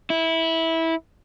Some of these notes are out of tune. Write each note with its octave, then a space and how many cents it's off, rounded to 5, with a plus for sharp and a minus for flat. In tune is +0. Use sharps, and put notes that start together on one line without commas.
E4 -15